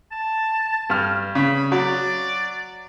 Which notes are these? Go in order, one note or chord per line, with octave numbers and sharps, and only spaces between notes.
A5
G2 F6
C#3 B5
F#3 D5